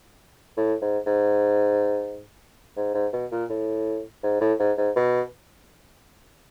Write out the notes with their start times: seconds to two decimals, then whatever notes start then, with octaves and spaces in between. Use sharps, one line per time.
0.57 A2
0.81 G#2
1.06 G#2
2.77 G#2
2.94 G#2
3.14 B2
3.31 A#2
3.50 A2
4.23 G#2
4.41 A2
4.59 G#2
4.78 G#2
4.96 B2